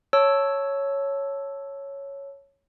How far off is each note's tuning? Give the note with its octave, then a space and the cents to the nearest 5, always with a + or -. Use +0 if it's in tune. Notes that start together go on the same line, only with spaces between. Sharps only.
C#5 +0 A5 +0 E6 +0